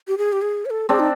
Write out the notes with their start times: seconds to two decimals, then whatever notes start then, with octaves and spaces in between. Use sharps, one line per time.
0.08 G4
0.18 G#4
0.32 G4
0.42 G#4
0.65 C#5
0.70 A4
0.89 C4 D4 G#4
0.99 D#4